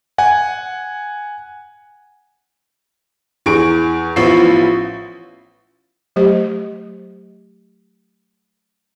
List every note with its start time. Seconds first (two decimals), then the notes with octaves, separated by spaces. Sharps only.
0.18 F#5 G#5
3.46 E2 G#4 C#6 D7
4.16 A1 F3 B3 E4 C#6 C7
6.16 F#3 A3 G4 C5 D#5